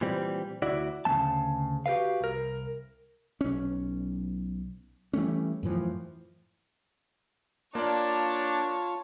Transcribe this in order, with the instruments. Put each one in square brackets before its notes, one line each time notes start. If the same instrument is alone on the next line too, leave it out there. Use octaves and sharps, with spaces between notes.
[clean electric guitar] A#2 E3 G3 C4
D2 E4 F#4 D5
D2 C#3 F3 A3 A5
F#4 G4 A#4 B4 F5
C2 A#4
[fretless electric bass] B1 C#4
E3 G3 A3 C#4
F#2 A2 E3 F3
[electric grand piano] A#3 D5 [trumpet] D4 [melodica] F4 [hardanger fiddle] C#5 A5